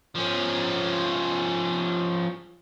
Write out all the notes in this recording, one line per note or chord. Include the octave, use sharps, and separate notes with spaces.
F3 C#4